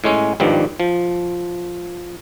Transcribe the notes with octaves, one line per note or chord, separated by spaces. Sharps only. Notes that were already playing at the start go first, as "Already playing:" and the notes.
A2 G#3 C#4
G#1 G2 D#3 F3 G3
F3